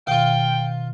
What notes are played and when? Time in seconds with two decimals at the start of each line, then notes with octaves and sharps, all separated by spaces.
0.07 B2 D#3 F4 F5 G5